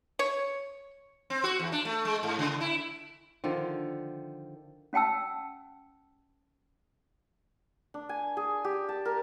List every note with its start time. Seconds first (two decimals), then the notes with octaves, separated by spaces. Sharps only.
0.19 C#5
1.30 C4
1.44 F#4
1.59 E2
1.72 D4
1.85 A3
2.05 G#3
2.23 G#2
2.39 C#3
2.61 E4
3.44 D3 D#3 F3
4.93 C#4 F#5 G5 A5 E6
7.94 D4
8.09 G#5
8.37 G#4
8.64 G4
8.89 A5
9.05 A#4